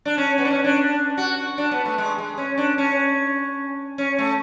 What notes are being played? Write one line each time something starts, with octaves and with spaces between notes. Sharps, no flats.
D4
C#4
B3
D4
C#4
D4
F#4
D4
B3
A3
G#3
G#3
C#4
D4
C#4
C#4
A3